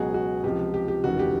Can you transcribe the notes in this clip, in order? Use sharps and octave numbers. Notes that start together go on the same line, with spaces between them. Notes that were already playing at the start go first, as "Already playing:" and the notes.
Already playing: C#2 B2 F#3 F#4 G#4
F#4
C#2 C3 F3 G4
G4
G4
F1 D#2 C#3 E3 F#4
G4